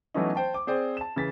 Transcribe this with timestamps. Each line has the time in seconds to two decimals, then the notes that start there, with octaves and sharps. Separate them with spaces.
0.14 E3 F#3 A3 B3 C#4 D#4
0.36 C5 G5 A5
0.54 D6
0.67 C4 G#4 C5 D5 G5
0.97 A5 E7
1.16 C#3 E3 A6 B6